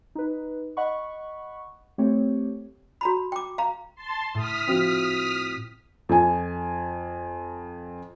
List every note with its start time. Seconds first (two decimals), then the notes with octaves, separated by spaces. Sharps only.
0.15 D#4 B4
0.77 D#5 F#5 B5 C#6
1.98 A3 C4 G4 C#5
3.01 F#4 A#5 B5
3.32 G5 D6
3.58 F5 A#5
3.95 A5 C6
4.35 A2 D#6 F6 B6
4.67 F3 C4 F#4
6.09 F2 G#5